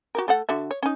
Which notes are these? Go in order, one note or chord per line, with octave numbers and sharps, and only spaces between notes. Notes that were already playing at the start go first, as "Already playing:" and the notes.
F#4 G4 A#4
A3 A4 F#5
D3 F#4 E5
C#5
C#4 D#4